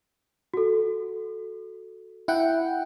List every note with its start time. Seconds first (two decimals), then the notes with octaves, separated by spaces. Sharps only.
0.54 F#4 A4
2.28 E4 F#5 G5